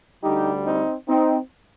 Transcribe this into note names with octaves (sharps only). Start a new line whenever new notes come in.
D2 D3 G3 D#4 G4
C4 D#4
C4 D#4